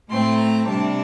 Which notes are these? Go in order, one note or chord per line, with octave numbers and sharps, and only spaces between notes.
A2 A3 C4 C6
A#5
C3 G3 D4 A5